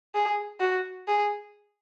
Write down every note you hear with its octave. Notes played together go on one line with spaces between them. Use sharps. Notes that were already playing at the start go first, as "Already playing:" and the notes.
G#4
F#4
G#4